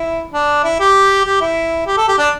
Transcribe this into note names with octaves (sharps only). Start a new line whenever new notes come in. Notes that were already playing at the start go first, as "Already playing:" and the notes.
Already playing: E4
D4
E4
G4
G4
E4
G4
A4
G4
D4